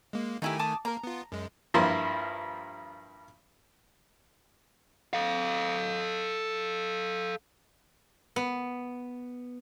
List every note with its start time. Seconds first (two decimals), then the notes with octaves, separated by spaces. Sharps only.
0.13 G#3 A#3
0.42 D#3 A3 D#4 E4 G4 G#5
0.59 A5 D6 D#6
0.85 A#3 A#4 A#5
1.04 B3 F4
1.32 F#2 G#3
1.74 G2 F3 A#3 E4 C6
5.13 A4 F5
8.36 B3